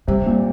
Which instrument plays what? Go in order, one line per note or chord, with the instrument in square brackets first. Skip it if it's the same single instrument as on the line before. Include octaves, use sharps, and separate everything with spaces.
[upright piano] C3 [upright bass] G3
[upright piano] A#2